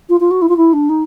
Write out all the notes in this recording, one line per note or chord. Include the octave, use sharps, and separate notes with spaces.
F4
F4
F#4
E4
F4
E4
D4
D#4